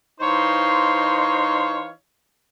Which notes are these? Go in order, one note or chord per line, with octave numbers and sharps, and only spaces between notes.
E3 D#4 C5 C#5 F5 C6